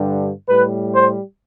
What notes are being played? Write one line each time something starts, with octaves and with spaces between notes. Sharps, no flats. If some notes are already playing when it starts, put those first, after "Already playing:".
Already playing: G2 D3 G3
A2 G3 B4
C5